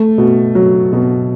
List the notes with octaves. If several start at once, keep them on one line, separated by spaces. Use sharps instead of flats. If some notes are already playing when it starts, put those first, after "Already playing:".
Already playing: A3
B2
F#3
B2